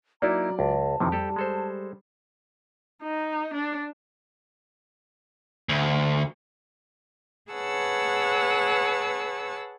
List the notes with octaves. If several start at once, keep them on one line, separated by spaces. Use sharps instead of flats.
F#3 A#3 D#4 E4 D5 A#5
C#2 A5
F2 C3 D#3 E3
G3 G4 A4
G#3 A4 C5
D#4
D4
D2
G#4 B4 C#5 F#5 A5 E6